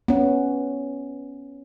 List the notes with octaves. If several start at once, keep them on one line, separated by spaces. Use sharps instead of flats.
B3 C#4